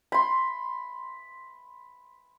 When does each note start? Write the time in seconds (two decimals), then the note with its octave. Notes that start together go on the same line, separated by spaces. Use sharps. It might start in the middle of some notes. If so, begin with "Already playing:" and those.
0.12 B5 C6